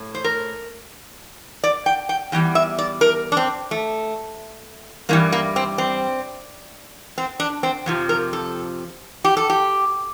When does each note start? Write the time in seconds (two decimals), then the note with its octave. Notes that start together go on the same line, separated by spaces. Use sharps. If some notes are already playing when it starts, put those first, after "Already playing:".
Already playing: A2
0.15 C5
0.24 A#4
1.64 D5
1.86 G5
2.09 G5
2.32 E2 E3 G3 G5
2.55 E5
2.78 D5
3.01 A#4
3.32 D4
3.37 C4
3.71 A3
5.09 G2 E3 G3 A#3
5.32 A#3
5.56 C4
5.78 C4
7.18 C4
7.40 D4
7.63 C4
7.86 F2 C3 F3
8.09 A#4
8.33 A4
9.24 G4
9.37 A4
9.50 G4